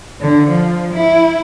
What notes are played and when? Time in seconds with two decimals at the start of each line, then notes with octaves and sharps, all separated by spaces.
0.21 D3
0.50 F3
0.95 E4